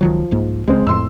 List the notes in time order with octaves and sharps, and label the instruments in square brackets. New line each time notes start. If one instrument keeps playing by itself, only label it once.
[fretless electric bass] C#2 D#3 F#3 [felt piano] F3
[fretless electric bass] C2 G#2 A#3
[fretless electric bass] D1 C#2 [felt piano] G#3 C4
[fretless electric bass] F2 A2 F3 [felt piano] C6 E6